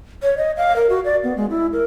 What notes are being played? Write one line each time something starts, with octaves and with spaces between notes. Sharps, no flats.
C#5
D#5
F5
A#4
F#4
D5
B3
G#3
E4
A#4